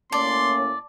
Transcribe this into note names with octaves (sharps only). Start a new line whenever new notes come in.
A2 A#3 C#4 D5 A5 C6 D6